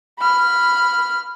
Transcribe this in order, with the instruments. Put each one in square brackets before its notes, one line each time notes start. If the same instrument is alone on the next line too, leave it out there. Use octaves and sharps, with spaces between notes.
[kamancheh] B5 F6